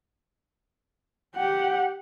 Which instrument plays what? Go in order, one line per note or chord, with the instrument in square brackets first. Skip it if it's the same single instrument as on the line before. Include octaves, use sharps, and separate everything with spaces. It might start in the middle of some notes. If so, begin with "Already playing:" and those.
[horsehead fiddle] G4 F#5